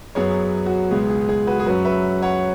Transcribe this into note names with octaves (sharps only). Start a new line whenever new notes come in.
F#2 F#3 B3 G#4 C#5
F#4
C#2 B2 G#3 B3 G#4
G#4
G#4
F#4 B4
G#4
F#2 F#3 C#4 F#4 B4
B4 E5
C#5 F#5